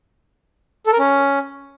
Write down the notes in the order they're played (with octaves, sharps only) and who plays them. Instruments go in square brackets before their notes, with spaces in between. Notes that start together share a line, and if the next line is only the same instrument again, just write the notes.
[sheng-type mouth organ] A4
A#4
C#4